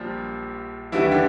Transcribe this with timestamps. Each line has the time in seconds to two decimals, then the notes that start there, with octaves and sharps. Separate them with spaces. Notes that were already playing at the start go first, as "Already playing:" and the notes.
Already playing: A#1 A#2 F3 G3
0.92 D#2 D3 E3 G3 E4
1.11 D3 D4